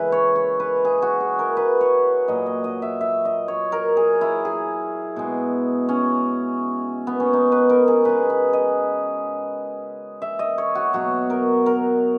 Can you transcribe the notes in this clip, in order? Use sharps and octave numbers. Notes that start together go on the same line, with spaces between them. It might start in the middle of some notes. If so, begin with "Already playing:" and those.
Already playing: C#3 E3 G#3 E4 B4
C#5
C#5
B4
G#4
F#4
G#4
A#4
B4
C#5
A#2 F#3 D#5
D#5
D#5
E5
E5
D#5
C#5
A#4
G#4
E4
G#4
B2 G#3
C#4
B3
C#4
D#4
B4
A#4
G#4
C#3 G#3 B4
B4
D#5
E5
D#5
C#5
F#4
B2 F#3 F#4
A#4
A#4